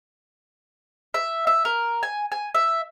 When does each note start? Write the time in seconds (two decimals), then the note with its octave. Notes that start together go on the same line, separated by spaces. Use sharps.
1.14 E5
1.47 E5
1.65 A#4
2.03 G#5
2.32 G#5
2.55 E5